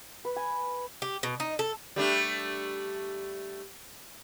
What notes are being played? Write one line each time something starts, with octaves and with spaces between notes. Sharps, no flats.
B4
G#5
G4
B2
D#4
A4
G3 A3 D4